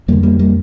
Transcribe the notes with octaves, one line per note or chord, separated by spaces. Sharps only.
F2 D3 G3 A#3
G3 A#3
G3 A#3